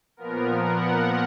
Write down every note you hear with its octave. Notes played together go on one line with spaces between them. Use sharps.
A#2 F3 B3 A#4
F#5